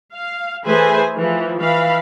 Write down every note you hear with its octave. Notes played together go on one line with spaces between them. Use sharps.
F5
E3 A3 G#4 B4 C5 G#5
E3 F3
E3 F5 B5